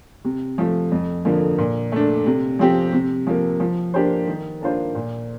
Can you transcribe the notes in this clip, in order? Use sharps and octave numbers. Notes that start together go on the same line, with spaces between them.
C3
F3 A3
F2
D3 F3 A#3
A#2
A3 D4
C3
F3 C4 G4
C3
F3 A#3
F3
A#3 D4 G4 C5
D#3
A#3 D4 F4 C5
A#2